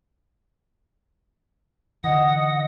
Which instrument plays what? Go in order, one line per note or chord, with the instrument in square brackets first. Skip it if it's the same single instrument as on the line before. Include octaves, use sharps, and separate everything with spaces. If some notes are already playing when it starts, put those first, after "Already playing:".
[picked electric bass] D3 E3 [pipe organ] D#5 D#6 [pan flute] F#5